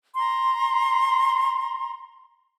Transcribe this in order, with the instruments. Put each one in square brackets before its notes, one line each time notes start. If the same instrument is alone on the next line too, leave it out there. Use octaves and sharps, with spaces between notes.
[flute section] A#5 C6